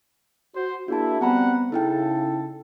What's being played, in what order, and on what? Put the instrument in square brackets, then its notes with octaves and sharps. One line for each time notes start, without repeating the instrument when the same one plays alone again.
[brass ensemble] F#4 C5
[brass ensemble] A#3 D4 E4 [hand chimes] F#4 G#4 A5
[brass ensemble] G3 C4 F#5 [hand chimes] B3 A#5 B5
[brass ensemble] C#3 A4 [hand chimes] D#4 E4 G5